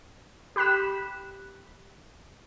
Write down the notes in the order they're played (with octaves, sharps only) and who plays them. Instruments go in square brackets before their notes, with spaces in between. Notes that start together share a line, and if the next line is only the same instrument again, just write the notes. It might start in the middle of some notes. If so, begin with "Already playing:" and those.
[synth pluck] G4 B5 F#6 B6 E7